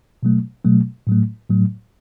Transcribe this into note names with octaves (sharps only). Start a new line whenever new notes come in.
B2 F#3 A3
B2 F#3 A3
A2 F#3 A3
A2 F#3 A3